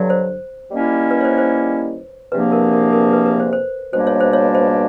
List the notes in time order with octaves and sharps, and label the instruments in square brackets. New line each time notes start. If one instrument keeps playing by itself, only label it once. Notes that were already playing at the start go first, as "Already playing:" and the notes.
Already playing: [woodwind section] G2 D3 F#3
[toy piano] C5
[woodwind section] D#3 G3 A#3 C#4 E4
[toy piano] B4
C#5
C5
C5
[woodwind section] E2 C3 F3 A#3 D4 [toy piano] B4
[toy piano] A#4
A#4
A#4
B4
B4
C5
C5
[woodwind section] C#2 B2 G3 A#3 D4 [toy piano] C5
[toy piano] C#5
C5
C#5
C5